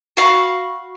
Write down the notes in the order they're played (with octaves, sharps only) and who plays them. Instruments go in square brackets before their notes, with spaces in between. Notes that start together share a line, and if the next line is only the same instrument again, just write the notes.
[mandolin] F#4 F5 B5 C#6